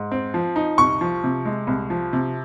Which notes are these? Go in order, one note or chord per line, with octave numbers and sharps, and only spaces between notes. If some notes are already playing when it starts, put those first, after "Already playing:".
Already playing: G#2
C4
F3
D#4
C2 C#6
F3
C3
G#3
C2
F3
C3